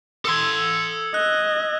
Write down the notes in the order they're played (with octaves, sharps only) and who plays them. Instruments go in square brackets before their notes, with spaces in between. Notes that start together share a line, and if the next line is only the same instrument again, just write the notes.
[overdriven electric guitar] A4 C6 [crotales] D#6 E6 G#6
[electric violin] D#5 [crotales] F#6